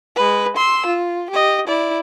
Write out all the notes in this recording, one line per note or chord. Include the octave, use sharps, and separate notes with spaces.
G#3 B4
C6 E6
F4
G4 D#5
E4 D5